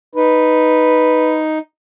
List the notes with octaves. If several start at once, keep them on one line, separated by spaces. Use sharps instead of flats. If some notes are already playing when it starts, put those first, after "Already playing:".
D#4 B4